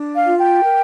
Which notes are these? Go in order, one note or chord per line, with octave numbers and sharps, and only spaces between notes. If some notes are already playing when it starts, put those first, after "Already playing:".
Already playing: D4
F5
F4
G5
A#4